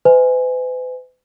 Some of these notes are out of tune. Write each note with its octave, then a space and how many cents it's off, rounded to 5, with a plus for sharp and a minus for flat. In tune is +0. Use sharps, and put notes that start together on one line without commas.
B4 +40 D#5 +35 G#5 +0